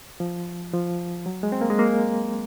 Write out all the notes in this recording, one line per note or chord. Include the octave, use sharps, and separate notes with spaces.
F3
F3
F#3
G#3
C4
A#3
G#3
A#3